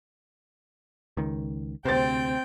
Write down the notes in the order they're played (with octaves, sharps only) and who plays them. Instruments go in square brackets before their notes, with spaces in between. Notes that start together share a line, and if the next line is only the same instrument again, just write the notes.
[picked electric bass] C#2 D#3
[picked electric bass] D2 C3 [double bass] C4 [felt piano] C5 A6 [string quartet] G5